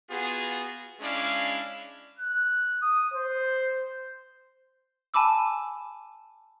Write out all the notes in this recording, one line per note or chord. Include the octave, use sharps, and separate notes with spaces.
B3 F4 F#4 G#4
G#3 C#4 D4 E4 D5 F5
F#6
D#6
C5
G#5 A5 B5 D6 E6